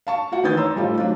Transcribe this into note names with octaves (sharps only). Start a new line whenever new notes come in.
F5 A5 C#6
F4 F#4 F#5
D#3 E3 D4 D#6 G6 A6
C#5 A#5 C6 E6
A2 F3 G3 A3 D#4 F4
F#3 D4 D#4 F4